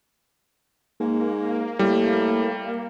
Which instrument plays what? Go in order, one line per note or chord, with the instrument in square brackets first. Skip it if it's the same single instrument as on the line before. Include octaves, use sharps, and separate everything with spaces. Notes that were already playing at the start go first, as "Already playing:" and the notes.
[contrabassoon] G#2 [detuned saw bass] A#3
[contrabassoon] A2 [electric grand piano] G3